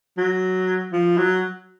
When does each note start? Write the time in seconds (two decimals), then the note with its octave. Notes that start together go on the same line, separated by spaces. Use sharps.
0.17 F#3
0.92 F3
1.18 F#3